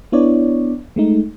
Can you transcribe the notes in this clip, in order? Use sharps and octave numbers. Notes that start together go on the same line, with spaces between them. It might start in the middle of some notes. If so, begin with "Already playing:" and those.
B3 D4 E4 C#5 D5
G#3 A3 D#4